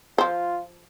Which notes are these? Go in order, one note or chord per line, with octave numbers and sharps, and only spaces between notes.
F3 F4 C5